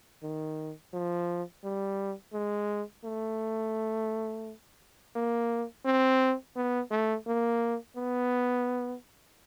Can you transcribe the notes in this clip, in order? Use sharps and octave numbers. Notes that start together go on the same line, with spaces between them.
D#3
F3
G3
G#3
A3
A#3
C4
B3
A3
A#3
B3